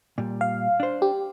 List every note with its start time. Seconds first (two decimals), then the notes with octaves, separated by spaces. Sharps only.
0.18 A#2 G3
0.41 F5
0.80 D4 C5
1.02 G4